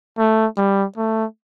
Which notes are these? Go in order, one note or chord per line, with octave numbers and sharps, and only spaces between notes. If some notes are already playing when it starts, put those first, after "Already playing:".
A3
G3
A3